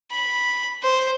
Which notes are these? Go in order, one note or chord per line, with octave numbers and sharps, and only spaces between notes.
B5
C5